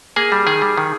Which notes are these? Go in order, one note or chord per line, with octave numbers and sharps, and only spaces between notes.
A#3 G#4 G#5
G3
D#3 G#4 G#5
G3
D#3